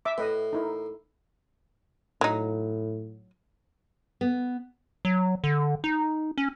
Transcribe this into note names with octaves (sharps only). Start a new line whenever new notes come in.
E5 D6
A2 B4 D#5
D#4 E4 A#4
A2 F#3 D#4
B3
F#3
D3
D#4
C#4